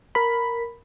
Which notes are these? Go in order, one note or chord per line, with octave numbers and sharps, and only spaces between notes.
A#4 B5